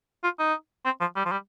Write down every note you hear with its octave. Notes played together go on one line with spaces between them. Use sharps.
F4
D#4
C4
F3
G3
F3
G3